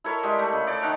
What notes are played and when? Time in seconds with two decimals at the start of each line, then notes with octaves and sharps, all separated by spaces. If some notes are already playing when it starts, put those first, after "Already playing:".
0.04 E4 A4 A#4 C#5
0.23 G3 G#3 E5
0.39 A3
0.53 C#3
0.67 A4 C#5 D5
0.82 D#3 F#5 A#5